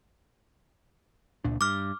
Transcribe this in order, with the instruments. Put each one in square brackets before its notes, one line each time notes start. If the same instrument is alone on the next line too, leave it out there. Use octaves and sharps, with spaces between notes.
[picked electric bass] C#2 A#2 D4
[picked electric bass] G2 [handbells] D6 F6